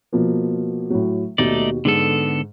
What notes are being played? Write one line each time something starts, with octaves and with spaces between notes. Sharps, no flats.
B2 F3 A#3
A2 F#3
D#2 B2 A3 D#4 D5
G#2 D3 B3 A4